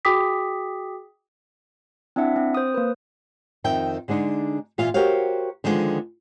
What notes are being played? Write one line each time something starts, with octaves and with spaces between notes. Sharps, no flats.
F#4 G#4 G5 D6 D#6 B6
C4 D4 E4 E5 F#5
C4
C5 D#6
A#3 B4
F2 D#3 E5 G5
D3 G#3 D4 D#4
A#2 E3 F4 E5 F5
F#4 G4 A#4 C5 C#5 F5
D3 D#3 F3 G#3 B3